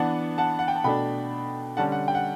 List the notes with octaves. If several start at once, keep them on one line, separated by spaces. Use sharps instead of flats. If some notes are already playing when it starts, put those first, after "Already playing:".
Already playing: E3 B3 D4 F#5 A5
F#5 A5
F#5
G5
A5
B2 A3 D4 G5 B5
D3 G3 C#4 F#5 A5
F#5
G5
F#5